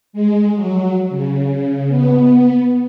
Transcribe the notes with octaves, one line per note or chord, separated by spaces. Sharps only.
G#3
F#3
C#3
B3